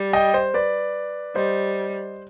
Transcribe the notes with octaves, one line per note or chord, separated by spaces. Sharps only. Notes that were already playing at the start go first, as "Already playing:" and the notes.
Already playing: G3
D#5 G5
C5
B4 D5
G3 C5 D#5